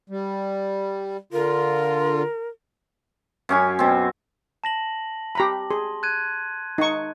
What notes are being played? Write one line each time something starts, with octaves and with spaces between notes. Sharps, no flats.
G3
D3 F4 A#4
F#2 C#4 G#5
B2 C4
A5 A#6 F#7
G4 A#5 B5
G#4 C6
F#6 G#6 D#7
D#4 C#6